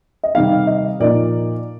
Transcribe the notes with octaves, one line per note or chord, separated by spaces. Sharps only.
D#5
C3 D#3 G3 C4 D#4 F5
D#5
A#2 F3 A#3 D#4 D5